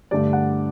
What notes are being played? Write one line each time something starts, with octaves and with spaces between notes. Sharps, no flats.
G2 D3 A3 D5
F#5